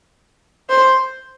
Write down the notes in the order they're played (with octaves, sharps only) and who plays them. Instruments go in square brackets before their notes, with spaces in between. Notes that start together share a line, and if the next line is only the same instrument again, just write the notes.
[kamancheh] C5